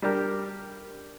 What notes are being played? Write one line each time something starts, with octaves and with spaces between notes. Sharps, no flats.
G3 D4 G4 A#4